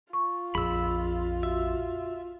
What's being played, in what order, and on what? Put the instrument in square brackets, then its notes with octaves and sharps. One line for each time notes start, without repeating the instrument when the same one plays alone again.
[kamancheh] F4 [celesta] C#6
[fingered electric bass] A#1 F2 [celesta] G#4 [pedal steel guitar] B5 E6
[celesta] F#4 [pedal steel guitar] E5